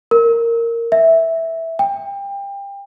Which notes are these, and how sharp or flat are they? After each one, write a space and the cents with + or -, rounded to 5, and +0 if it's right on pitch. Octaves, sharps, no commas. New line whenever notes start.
A#4 -10
E5 -5
G5 +25